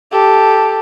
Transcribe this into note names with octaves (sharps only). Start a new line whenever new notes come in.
G4 A4